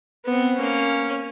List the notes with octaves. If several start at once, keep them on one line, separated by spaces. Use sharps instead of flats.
B3 C4
A#3 C#4